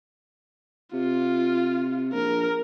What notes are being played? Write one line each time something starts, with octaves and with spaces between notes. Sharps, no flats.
C3 F4
A#1 A#4